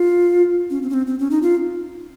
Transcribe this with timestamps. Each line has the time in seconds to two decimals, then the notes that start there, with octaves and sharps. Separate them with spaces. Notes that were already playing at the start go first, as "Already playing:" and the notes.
Already playing: F4
0.70 C#4
0.82 C4
0.90 C#4
0.94 C4
1.07 C4
1.19 C#4
1.31 D#4
1.42 F4